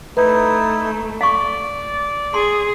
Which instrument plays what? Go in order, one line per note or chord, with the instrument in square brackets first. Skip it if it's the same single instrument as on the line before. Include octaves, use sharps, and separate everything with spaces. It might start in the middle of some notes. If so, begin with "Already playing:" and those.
[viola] A3 [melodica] D#4 E4 [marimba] B4
[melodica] D5 [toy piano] F5 C#6
[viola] G#4 [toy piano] C6